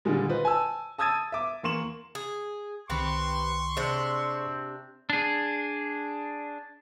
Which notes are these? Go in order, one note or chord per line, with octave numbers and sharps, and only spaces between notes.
A#2 D3 D#3 G3 G#3
F4 B4 C5 D#5
G#5 A5 E6
A5 D#6 E6 G#6 A6 D#7
E5 D6
E2 A#3 C6 C#6 E7 F#7
G#4
C2 D#3 C4 G4 B4 C6 C#6
C3 C4 D4 G#4 C5 D5
D4 G#4